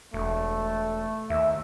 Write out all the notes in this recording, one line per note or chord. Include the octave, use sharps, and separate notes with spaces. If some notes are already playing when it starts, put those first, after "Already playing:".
E1 A3
D#2 E5